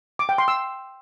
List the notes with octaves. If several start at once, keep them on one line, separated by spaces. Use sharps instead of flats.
D6
G5
C6
E6